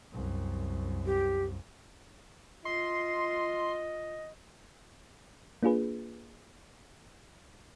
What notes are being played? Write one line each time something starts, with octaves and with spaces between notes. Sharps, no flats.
C2 F#2
G4
F4 D#5 C6
A#3 D4 F4 G#4 B4